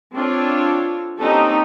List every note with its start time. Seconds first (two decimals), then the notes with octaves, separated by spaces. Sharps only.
0.14 C4 D4 F4 A4 C#5
1.19 A#3 C4 C#4 D#4 G4 A4